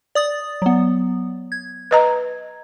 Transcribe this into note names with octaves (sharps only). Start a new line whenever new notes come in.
D5 D#6 A6
F#3 B3
G#6
B4 D#5 A#5